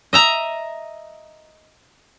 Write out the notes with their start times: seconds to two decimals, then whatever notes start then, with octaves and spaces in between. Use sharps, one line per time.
0.13 D#5 E5 A#5